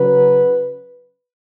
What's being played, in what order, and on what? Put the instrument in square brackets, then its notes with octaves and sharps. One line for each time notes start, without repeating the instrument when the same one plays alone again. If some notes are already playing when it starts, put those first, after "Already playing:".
Already playing: [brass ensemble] C#3 F#3 B4